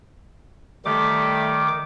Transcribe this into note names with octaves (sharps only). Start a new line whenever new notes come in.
D#3 G3 A3 D6